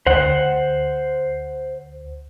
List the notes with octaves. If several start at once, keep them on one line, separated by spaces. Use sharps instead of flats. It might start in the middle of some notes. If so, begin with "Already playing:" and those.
D2 C5 F#5